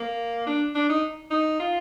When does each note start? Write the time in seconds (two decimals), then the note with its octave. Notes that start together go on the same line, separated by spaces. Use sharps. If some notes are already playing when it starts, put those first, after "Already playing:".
Already playing: A#3
0.47 D4
0.75 D4
0.89 D#4
1.31 D#4
1.60 F4